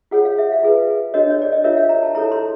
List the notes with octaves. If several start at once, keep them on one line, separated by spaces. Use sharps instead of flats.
F4 G#4 C#5 F#5
F5
E5
F5
F4 G#4 B4
D4 F#4 A#4 C#5 D#5
C#5
D5
D#5
F4 A#4 C#5 E5
F5
A#5
A5
E4 A4 C#5 A#5
C6